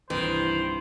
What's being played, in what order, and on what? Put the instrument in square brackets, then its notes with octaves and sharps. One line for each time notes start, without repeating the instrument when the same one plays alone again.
[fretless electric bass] C2 G2 [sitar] D#3 [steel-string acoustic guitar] E3 [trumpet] C5